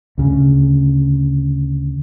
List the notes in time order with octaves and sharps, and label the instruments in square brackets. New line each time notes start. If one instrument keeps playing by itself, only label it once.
[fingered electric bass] D2 C#3